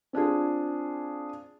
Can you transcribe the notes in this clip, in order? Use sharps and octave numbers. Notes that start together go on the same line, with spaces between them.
C4 D4 F4 G#4